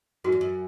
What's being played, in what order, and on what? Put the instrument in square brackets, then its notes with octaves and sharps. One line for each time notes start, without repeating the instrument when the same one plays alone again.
[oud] F#2 [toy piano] F#4
[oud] E2
F#2